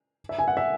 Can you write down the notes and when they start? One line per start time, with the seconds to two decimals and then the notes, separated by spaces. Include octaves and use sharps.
0.29 E5
0.39 G#5
0.48 F#5
0.57 E5